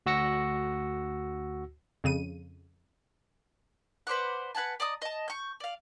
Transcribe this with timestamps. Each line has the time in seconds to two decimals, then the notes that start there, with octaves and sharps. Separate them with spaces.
0.06 D2 F#4 E6 A#6 C#7
2.04 F2 C#3 D#7
4.07 B4 C5 D5 F#5
4.55 B4 F#5 G#5 A5
4.80 D5 D#5 A#5 D#6
5.02 D#5 A5
5.28 C#6 G6
5.60 D5 F5